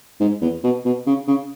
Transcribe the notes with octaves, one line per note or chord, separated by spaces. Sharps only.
G#2
E2
B2
B2
C#3
C#3